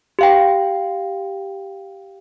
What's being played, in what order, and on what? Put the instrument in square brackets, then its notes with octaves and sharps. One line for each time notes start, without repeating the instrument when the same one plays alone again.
[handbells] G4 F5 G5